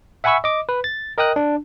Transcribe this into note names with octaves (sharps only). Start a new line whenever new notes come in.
E5 F#5 G#5 B5 C#6 E6
D#5 D6
B4
A6
A#4 D#5 G5 D#6 F#6
D4